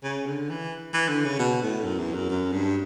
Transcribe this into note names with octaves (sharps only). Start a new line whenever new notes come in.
C#3
D3
E3
E3
D3
C#3
B2
A2
F#2
E2
F#2
F#2
G2